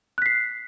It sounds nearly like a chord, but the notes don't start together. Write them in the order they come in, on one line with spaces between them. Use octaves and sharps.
F#6 B6 C7